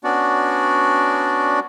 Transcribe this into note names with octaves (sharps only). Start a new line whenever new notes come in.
B3 C#4 D4 F#4 D5